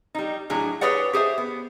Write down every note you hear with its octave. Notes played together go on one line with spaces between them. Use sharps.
G3 D#4
A2 F#3 D4 G#4
G4 G#4 B4 C#5 D5 F#5
G4 G#4 C5 E5
B3